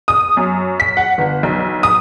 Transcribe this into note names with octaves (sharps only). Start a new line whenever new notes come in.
D#6
F#2
B6
F#5
G1
B1
D#6